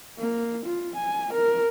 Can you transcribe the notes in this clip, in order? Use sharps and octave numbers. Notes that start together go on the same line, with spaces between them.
A#3
F4
G#5
A#4